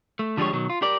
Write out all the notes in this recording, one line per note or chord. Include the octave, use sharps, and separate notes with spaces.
A3
D3 F3 G3 G#3 G4 C#5
B2 D#3 F#3
F4
G4 A#4 D5